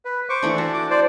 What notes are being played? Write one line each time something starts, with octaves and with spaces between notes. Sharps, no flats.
B4
C5 C#6 D6
E3 A3 D4
F#4 A5
D6
C5 D5